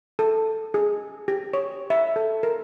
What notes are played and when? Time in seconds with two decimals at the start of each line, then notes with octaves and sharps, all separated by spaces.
0.19 A4
0.74 G#4
1.28 G4
1.54 C#5
1.90 E5
2.16 A4
2.43 A#4